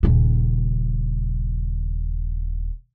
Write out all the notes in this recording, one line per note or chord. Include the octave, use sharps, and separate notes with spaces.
D#1 C#3